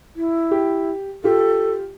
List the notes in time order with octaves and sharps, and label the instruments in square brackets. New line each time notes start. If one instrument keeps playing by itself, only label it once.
[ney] E4
[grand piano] G4
[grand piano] F4 G4 [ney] A4